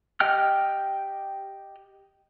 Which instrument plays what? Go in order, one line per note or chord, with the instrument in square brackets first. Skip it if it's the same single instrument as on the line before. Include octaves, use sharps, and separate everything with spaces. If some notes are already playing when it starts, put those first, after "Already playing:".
[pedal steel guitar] G4 D#5 G5 F6